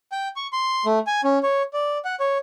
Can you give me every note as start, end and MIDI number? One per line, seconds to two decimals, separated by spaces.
0.12 0.28 79
0.36 0.47 85
0.53 0.85 84
0.86 0.99 57
1.07 1.21 80
1.24 1.39 61
1.43 1.63 73
1.74 1.98 74
2.05 2.15 78
2.20 2.38 73